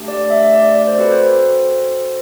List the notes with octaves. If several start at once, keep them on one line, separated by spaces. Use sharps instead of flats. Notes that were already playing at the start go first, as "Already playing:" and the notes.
Already playing: A3 D4 G4
D5
E5
D5
D5
C5
C4 F#4 A4 B4
C5